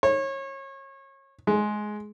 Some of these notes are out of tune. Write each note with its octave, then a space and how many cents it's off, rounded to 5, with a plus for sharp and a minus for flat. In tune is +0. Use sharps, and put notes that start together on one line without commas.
C#5 -30
G#3 +15